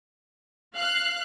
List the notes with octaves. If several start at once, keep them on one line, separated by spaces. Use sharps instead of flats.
F5 F#6